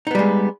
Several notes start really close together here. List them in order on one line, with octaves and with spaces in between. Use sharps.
D#4 B3 G3 G#3